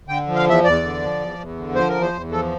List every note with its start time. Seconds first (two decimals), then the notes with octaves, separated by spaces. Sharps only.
0.08 D3 G5
0.27 F3
0.35 F5
0.46 E2 E5
0.64 E2 D5
0.83 D3
1.02 F3
1.20 E2
1.38 E2
1.57 D3
1.75 F3 C5
1.89 A#4
1.94 E2
2.02 C5
2.13 E2
2.31 F3 A4